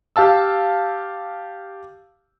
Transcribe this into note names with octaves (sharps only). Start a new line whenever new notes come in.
G4 F5 A5 E6